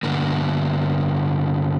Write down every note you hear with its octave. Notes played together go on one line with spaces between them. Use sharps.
G2 D3 A#3